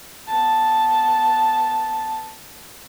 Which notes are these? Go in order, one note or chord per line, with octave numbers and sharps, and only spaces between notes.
B3 A5